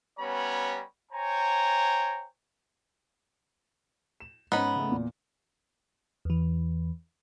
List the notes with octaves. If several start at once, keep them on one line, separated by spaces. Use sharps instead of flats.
G3 B3 C#4 C#5 A#5 B5
C5 C#5 G5 G#5 A#5
E7
G#2 B3 C#4 D#4 B5
C#3 A3
E2 A#2
E2 E3